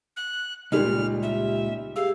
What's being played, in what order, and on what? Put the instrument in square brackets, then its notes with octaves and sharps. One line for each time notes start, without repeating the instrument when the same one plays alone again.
[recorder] F#6
[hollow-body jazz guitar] C#2 A#2 [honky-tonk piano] G3 D#4 [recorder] F6
[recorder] E5
[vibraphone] G4 G#4 E6 [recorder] F5